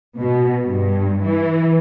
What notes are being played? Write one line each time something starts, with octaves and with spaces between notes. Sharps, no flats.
B2
G2
E3